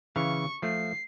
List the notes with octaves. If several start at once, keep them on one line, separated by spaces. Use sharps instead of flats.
C#3 E3 F5 C#6
F3 A3 C7